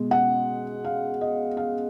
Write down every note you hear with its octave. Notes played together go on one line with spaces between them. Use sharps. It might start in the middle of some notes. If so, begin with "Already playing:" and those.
Already playing: B2 G#3
F#5
F5
D#5
F5